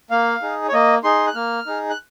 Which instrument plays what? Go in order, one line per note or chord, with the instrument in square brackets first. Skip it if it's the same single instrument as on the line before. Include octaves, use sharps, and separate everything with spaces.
[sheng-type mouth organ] A#3 F5
D#4 G#4
C#5
A#3 D#5
D#4 G#4 C6
F#6
A#3 F6
D#4 G#4
F#6